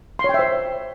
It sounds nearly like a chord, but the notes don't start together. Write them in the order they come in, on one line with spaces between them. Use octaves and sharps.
C6 C#5 G5 E5 C5